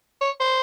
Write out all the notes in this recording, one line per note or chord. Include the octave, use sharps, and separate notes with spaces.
C#5
C5